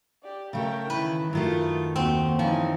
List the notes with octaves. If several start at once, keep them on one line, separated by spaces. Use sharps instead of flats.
G4 D5
C#3 A3 A#4 G5
D#3 E3 E4 B4
F#2 D#3 A3 E4 F4
D#2 C4 F#4
E3 F3 C#4 D#4 G#5